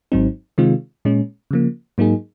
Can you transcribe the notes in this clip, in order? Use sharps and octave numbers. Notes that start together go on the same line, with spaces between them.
G#1 G#2 F#3 C4 D#4
C3 D#3 G#3 C4 F4
A#2 G#3 C#4
C#3 F3 A#3
G#2 F#3 A#3 D#4 G#4